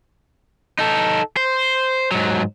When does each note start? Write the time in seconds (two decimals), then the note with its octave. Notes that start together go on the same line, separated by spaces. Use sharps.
0.79 D#4 A4
1.37 C5
2.11 G#2 F#3